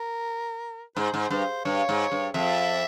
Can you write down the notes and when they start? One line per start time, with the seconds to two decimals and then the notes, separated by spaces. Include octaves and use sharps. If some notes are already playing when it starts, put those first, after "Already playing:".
Already playing: A#4
0.96 G#2 C5
1.14 G#2
1.30 G2 C5
1.65 G2 C#5
1.89 G#2
2.12 G2
2.34 F2 E5